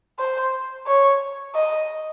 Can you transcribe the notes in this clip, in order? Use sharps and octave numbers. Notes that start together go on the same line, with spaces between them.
C5
C#5
D#5